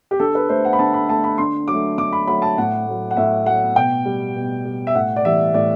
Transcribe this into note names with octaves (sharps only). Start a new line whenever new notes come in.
G4
D3 A4
B4
A3 C5
F#5
B5
D3 A5
B5
A3 A5
B5
D3 C6
F#3 D6
A3
D3 D6
B5
F#3 A3 B5
A5
A2 F#5
F#3 A3
F#5
A2 E5
F#3 A3 F#5
B2 G5
G3
B2
G3
E5
A2 F#5
D5
E3 G3 E5
A2 D5